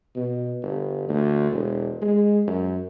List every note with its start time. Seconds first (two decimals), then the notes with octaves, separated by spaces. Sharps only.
0.16 B2
0.62 G1
1.08 D2
1.52 E1
2.02 G#3
2.47 F#2